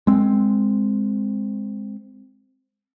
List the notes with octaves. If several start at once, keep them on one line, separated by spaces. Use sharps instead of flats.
G#3 C4